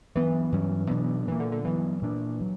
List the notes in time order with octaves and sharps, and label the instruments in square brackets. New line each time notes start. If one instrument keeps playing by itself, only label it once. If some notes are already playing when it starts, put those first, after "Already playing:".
[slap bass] G2 F#3 B3 [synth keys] E3
[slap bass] G2 F#3 C#4
B2 F#3 B3 D4
[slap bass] A#2 F#3 A#3 [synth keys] E3
[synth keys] D3
D3
[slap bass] G2 F#3 B3 [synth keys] E3
[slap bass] A#2 A#3 D4
F#3